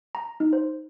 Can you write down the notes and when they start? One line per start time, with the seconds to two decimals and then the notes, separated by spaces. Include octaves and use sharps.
0.15 A#5
0.40 D#4
0.53 C5